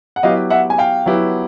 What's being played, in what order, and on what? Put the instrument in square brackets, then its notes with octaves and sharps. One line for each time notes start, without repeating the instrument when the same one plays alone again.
[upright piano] F#5
[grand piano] F#3 B3 E4 G4 B4 [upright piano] D#5 F5
[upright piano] E5 F#5
G#5
F5 G5
[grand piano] F#3 B3 E4 G4 B4